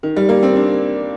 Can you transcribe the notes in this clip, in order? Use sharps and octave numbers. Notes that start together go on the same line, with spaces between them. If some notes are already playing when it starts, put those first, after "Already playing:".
D#3
G3
A#3
C4
D4